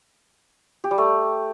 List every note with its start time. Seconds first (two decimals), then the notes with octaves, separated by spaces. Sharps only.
0.84 G4
0.91 G3
0.98 A3